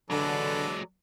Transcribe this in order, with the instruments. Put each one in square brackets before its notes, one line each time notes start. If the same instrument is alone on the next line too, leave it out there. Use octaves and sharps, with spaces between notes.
[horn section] D3 [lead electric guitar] F#3 G#3 [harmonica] A4 B4 D5